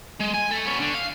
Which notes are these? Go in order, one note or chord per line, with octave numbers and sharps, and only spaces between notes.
G#3
G#5
A3 A4
B3 C#4
D3
F5